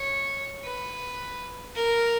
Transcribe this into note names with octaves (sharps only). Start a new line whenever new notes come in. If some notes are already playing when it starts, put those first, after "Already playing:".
Already playing: C#5
B4
A#4